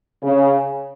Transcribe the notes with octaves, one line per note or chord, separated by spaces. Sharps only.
C#3